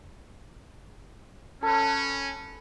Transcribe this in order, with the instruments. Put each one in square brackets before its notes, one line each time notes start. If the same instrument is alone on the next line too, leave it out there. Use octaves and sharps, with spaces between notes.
[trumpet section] C#4 [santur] A4 B4